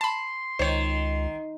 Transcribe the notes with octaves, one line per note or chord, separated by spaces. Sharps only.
A5 B5 C6
C#2 D#3 C5 C#5